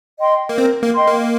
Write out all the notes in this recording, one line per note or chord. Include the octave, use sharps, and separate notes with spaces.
D#5 G5 C6
A#3
C4 A#4
A#3
D#5 G5 C6
A#3